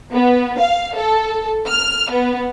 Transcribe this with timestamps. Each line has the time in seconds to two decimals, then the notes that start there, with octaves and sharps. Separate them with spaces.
0.13 B3
0.60 F5
0.97 A4
1.69 F6
2.11 B3